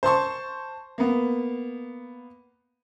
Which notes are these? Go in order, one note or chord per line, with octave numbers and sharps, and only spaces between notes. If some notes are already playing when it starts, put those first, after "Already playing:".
C5 A5 C6 C#6
A#3 B3